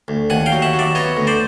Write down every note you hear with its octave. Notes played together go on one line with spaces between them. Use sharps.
D2
D#2 F#5 G#5
F5 G5
F#3
E5 F#5
F#3
D5 E5
B3 C#5 D#5
D2
C5 D5